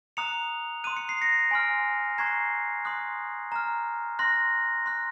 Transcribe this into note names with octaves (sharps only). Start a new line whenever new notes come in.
A#5 D#6 F#6 C#7 F7
C6 D#6 F#6 D#7
C#7
C7
A#6 C#7
G#5 C6 F6
A#5 C#6 F#6 G#6 C7
C6 D#6 F#6
A#5 F6
C6 F#6 A#6
C6 F#6